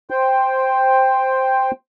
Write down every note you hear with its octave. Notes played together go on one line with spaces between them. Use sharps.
C5 G5